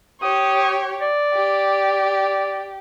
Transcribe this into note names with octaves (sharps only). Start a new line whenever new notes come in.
G4 C#5 D#6
D5
G4